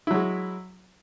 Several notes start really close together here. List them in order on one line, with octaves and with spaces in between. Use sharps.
E4 F#3 G#3